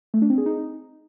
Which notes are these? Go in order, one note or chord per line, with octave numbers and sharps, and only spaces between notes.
A3
D4
C4
G#4
D#4